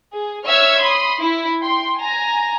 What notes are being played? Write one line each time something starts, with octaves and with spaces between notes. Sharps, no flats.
G#4
C#5 E5 C#6 E6 F6 G#6
B5 C6 D#6
E4
G5 C6
G#5 A#5